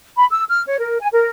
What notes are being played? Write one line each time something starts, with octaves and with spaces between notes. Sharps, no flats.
B5
E6
F6
C#5
A#4
G#5
A#4